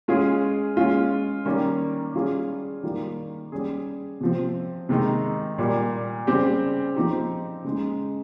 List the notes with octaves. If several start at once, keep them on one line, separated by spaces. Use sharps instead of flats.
G#3 C#4 F4 G#4
G#3 C#4 F4
D#3 G3 A#3 C#4
G3 C#4 F4 G#4
D#3 G3 A#3 F4
G3 C#4 G#4
C3 F3 C4
C3 D#3 G#3 D#4
A#2 G3 A#3
C#3 G3 C4 G4
F3 C4 D#4 G4
C#3 G#3 D#4